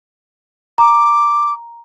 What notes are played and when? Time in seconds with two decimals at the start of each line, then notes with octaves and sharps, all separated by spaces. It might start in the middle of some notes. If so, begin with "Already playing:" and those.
0.78 A#5 D6